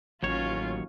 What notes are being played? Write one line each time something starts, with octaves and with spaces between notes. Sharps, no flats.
A1 D#2 F#3 C#4 F4 C#5